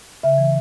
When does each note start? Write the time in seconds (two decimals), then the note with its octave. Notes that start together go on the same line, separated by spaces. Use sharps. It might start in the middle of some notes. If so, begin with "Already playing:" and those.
0.23 C#3 E5
0.38 E3